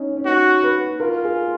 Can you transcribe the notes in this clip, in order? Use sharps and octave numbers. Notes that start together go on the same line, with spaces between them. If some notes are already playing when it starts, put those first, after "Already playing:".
Already playing: C#4 D#4
C#4
D#4 F#4
B4
F4 A#4
G#4